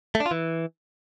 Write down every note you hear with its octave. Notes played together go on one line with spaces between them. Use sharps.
A3
D4
F4
E3